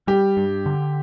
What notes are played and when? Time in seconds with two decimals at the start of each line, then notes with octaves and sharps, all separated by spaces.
0.07 G3 G4
0.37 G2
0.66 D3